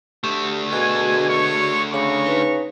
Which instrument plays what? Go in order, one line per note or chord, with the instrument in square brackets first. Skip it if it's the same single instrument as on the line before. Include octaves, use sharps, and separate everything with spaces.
[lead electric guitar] D2 A3 [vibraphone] G4
[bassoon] B2 [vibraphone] F#4 G#4 [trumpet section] G#5
[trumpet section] C#5 C#6
[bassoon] C#3 [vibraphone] D4 B5 D6 [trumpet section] F#4 A#5 C#6
[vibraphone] D#4 B4